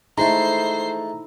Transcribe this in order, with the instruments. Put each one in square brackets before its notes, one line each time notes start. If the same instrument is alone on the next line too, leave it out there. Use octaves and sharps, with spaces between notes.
[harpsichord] G#3 A3 [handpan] D#4 E4 A4 [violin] C5 C7 [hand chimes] A#5